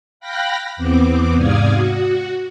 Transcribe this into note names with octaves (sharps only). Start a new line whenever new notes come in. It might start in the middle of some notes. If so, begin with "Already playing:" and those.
F5 G5 B5 F#6 A#6 B6
E2 B3 C4 D6
G#2 C3 D5 F5 D#6 G#6
F#4